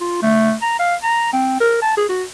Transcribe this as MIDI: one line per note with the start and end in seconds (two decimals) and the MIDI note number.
0.01 0.18 65
0.23 0.53 57
0.62 0.78 82
0.80 0.95 77
1.03 1.32 82
1.33 1.60 60
1.60 1.77 70
1.82 1.97 81
1.97 2.06 68
2.09 2.24 66